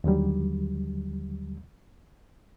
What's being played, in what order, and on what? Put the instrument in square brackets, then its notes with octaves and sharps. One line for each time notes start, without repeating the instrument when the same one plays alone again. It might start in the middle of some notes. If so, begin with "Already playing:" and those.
[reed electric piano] D#2 D3 F#3 G3